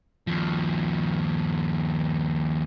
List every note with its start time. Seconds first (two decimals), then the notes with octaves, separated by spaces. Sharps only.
0.27 D#2 F3